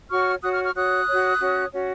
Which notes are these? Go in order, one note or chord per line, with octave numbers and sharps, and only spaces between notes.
F#4 C#5 C#6 F6
F#4 C#5 D#6 F#6
C#6 F6
C#6 F6
F#4 C#5 D#6 F#6
F#4 C#5
C#4 F#4 C#5
C#4 F#4 C#5